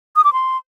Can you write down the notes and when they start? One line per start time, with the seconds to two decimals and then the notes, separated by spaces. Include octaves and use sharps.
0.16 D#6
0.24 D6
0.33 C6